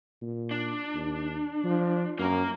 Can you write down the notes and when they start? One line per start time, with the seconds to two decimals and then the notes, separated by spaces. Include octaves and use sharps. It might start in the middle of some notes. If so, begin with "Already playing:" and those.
0.21 A#2
0.51 D4
0.94 D#2
1.64 F3
2.19 F#2 A#3 A#4